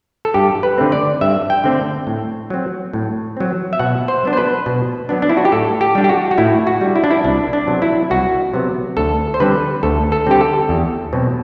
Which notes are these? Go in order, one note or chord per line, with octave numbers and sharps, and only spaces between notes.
A4
G2 G4
B4
D3 A3 C4
D5
G2 E5
G5
D3 A3 C4
A2
F#3 C4
A2
F#3 C4
E5
B2 F#5
C5
F#3 B3 D4
C5
B4
B2
F#3 B3 D4
D4
E4
F#4
G4
A2 A4
G4
G3 D4
G4
F#4
F#4
A2 E4
F#4
G3 D4
E4
D4
E4
C2 D4
D4
C3 F#3 B3
E4
C2 F#4
C3 F#3 B3
D2 A4
C5
D3 G3 C4 B4
D2 A4
A4
D3 G3 C4 G4
A4
E2
B2 F#3 C4